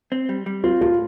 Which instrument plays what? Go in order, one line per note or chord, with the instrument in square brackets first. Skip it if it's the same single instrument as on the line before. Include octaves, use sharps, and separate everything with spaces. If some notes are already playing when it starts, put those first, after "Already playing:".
[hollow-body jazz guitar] C4
G3
G3
[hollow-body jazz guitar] C4 [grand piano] F4
[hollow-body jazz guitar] A2 [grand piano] F4